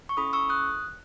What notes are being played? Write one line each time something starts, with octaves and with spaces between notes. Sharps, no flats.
C#6
C#4 E4 A4 B5 D#6
C#6 E6
D#6 F#6